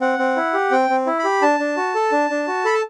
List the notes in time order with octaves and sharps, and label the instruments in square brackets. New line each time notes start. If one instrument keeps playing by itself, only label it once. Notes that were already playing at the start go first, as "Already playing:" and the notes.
[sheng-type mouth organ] C4 F#5
C4
E4
G4
C4 G5
C4
E4
B5
G4
D4 A5
D4
F#4
A4
D4
D4
F#4
A4 B5
A5